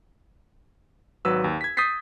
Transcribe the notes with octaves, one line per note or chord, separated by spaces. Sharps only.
G#1 F#3 B4 E6
D#2
G#6 B6
D#6 G6 A6 B6 C7